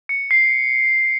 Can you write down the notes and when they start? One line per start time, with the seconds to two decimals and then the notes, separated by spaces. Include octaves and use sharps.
0.09 C#7
0.31 C7